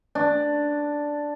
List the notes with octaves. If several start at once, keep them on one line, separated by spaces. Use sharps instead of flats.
D4